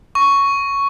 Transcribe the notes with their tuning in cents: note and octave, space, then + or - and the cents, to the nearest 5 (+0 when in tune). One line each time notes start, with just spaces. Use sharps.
C#6 +5